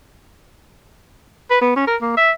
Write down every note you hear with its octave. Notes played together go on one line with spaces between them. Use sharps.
B4
B3
C#4
A#4
A#3
E5